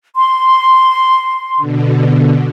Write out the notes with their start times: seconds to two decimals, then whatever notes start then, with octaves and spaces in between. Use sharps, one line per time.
0.16 C6
1.57 B2 D3